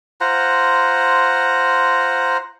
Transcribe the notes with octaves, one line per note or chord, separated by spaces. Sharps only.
F4 C5 F#5 A#5